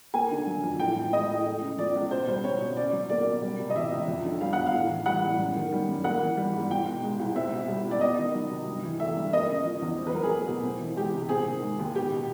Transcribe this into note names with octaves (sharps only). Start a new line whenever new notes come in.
A#3 G#5
D3
F#3
F2
A2 G5
F3
G#3 D#5
A2
A3
C#3
F3 D5
C#2
B2 C5
G3 C5
C4 C#5
B2
C#4 D5
F#3
A#3 D5
B2
G3
C3
D#5
E3 E5
C#2
F2
D3
G3 F5
F2 F#5
F5
A2
E3
G3 F#5
A2
F#2
D#3
G3
F#2
A#3 F#5
E3
G3
G#2
C2 G5
B2
G#3
C2
C4 E5
B2
G3
C#2
D5
B3 D#5
D#3
F#3
C3
G2
E3
A3 E5
G2
A#3 D#5
C#3
F3
E2
C4
B4
F#3 A#4
G#4
A3
B2
C4
E3
G#3 G4
C3
C4 G#4
D#3
G#3
D#2
B3 G4
B2